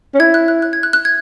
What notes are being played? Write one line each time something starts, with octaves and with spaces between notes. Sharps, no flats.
C#4
E4 G#6
F#6
F#6
F#6
G#6
F#6
F#6
G#6